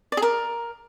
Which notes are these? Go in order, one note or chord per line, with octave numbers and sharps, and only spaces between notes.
D5
G#4
A#4